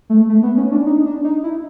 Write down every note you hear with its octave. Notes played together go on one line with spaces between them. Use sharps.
A3
A3
B3
C#4
D4
D#4
D4
D#4
E4